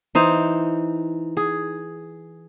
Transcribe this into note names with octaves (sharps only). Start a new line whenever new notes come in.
E3 D#4 C5
G#4